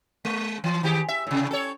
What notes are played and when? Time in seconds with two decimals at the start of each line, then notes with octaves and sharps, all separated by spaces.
0.25 G#3
0.64 E3
0.83 D#3 G4 G#4
1.08 E5
1.27 A2 C3
1.51 A4 C#5